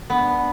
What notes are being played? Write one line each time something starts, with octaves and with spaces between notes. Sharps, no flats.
B3 D4